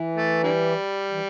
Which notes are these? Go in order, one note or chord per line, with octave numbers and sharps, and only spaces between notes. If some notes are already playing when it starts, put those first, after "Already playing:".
Already playing: E3
A3
D3 G3
E3